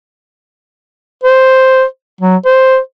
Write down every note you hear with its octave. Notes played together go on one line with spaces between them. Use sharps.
C5
F#3
C5